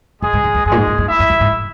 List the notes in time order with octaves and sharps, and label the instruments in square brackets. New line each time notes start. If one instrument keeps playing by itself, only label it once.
[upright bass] F#2 [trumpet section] G#3 G#4
[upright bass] G#2
G#2
E2
[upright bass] F#2 [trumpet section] G#3 G#4
[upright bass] A#2
G#2
G#2
F#2
[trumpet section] E4 E5
[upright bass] F#2
F#2
G#2